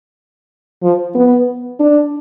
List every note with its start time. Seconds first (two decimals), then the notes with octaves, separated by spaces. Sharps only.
0.83 F3
1.15 B3
1.80 D4